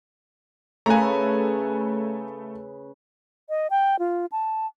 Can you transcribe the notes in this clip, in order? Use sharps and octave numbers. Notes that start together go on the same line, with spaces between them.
C#3 A3 B4 G#5 A#5
D#5
G5
F4
A5